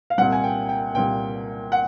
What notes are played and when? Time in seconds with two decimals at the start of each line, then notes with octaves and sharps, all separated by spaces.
0.10 F5
0.18 C2 A#2 G3 F#5
0.32 G#5
0.44 G5
0.69 G5
0.94 C2 A#2 G3 G5
1.72 F#5